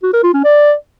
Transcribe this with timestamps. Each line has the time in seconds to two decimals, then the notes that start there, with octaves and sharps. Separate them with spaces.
0.03 F#4
0.13 A#4
0.23 F4
0.34 C#4
0.44 D5